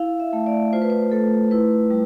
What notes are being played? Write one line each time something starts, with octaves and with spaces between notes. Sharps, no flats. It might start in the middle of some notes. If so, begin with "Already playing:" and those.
Already playing: E4 F5
E5
A3
D5
F4 C5
B4
C5
A3 A4
E4 B4
G3